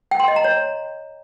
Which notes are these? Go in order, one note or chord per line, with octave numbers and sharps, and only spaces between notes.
G5
C6
D#5
A#5
C#5